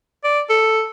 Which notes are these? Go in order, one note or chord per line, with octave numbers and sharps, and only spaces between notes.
D5
A4